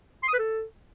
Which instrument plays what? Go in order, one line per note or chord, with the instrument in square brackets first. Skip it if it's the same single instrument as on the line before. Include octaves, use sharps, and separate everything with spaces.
[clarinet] C6
D#6
B4
A4